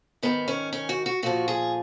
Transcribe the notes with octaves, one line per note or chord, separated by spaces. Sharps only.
G#2 D#3 B3
C#4
C#4
F#4
F#4
A#2 F3 F#4
G#4